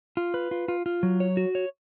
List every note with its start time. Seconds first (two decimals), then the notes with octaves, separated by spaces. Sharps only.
0.17 F4
0.34 B4
0.51 F4
0.68 F4
0.86 F4
1.03 F#3
1.20 C#5
1.37 F#4
1.55 C#5